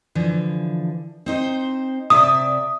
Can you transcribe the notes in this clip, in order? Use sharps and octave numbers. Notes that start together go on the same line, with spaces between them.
D3 E3 F3
C4 D#4 C5
C3 D5 E5 D#6